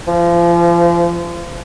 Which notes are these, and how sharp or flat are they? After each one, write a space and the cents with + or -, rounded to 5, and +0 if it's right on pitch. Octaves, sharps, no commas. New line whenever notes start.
F3 -30